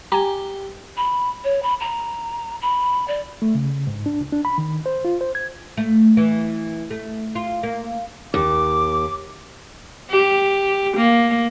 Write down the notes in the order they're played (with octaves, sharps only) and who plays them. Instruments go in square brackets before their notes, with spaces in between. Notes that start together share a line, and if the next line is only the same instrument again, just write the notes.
[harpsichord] G4 [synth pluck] G#5 A#5
[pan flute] B5
C#5
B5
A#5
B5
D5
[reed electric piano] A3
C#3
G#2
D4
C#2
D4
B5
D#3
C5
F4
C5
G#6
[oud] A3
E3
A3
F4
A#3
[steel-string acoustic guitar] D#2 [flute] D6
[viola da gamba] G4
A#3